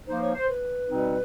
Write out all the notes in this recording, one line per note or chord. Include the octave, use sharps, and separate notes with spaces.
F3 A#3 D#4 C5
C#5
C5
B4
B2 G3 C4 D#4